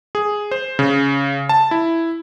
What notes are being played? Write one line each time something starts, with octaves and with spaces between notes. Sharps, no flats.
G#4
C5
C#3
A5
E4